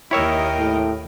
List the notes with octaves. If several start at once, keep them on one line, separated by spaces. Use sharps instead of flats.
D#2 E4 A#4 C#5 D#5 E5 G5
A2